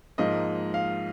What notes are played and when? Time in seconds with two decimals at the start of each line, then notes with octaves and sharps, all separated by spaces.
0.18 G#2 F3 A#3 D#5
0.74 F5